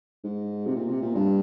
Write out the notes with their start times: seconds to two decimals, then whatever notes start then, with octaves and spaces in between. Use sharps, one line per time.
0.24 G#2
0.66 C3
0.76 A#2
0.88 C3
1.02 A#2
1.15 G2